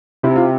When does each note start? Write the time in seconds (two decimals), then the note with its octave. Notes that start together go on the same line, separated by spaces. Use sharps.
0.23 C3 E4
0.36 F4